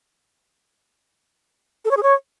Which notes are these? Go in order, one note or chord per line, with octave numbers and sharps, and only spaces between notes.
A4
C#5
G#4
C#5